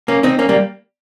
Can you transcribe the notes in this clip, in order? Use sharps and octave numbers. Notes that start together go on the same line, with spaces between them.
A#3 C#4
C4 D#4
A#3 C#4
G3 A#3